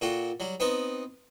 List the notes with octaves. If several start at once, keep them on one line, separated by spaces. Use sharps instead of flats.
A#2 F#4 A4 G5
F#3 G3
B3 C4 D#4 B4